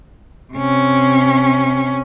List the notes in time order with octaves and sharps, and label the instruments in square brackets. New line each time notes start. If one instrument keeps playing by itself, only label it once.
[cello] C3 C#4